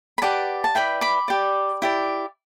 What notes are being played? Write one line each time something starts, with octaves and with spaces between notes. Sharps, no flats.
B5
G4 B4 D5 F#5 A5
A5
E4 B4 D5 G5 B5
B5 D6
G4 D5
E4 G4 D5